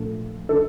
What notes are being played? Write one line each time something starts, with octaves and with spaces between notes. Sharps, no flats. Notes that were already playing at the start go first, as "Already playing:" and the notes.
Already playing: A#1 A#2 A3
D3 A4